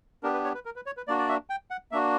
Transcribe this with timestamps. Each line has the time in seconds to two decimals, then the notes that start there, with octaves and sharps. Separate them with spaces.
0.23 B3 D4 G4 A#4
0.34 B4
0.44 C#5
0.54 B4
0.65 A#4
0.76 B4
0.86 C#5
0.97 B4
1.07 A#3 D4 F#4 D5
1.19 D5
1.29 E5
1.50 G5
1.70 F#5
1.91 A#3 D4 F#4 E5